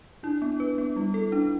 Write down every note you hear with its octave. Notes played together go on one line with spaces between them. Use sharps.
D4 E4
B3
B4
B3
G3 E4
A4
E4
D4 F4